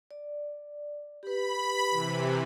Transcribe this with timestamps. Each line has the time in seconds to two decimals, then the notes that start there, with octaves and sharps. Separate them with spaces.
0.11 D5
1.23 G4 B4 B5
1.91 C3 E3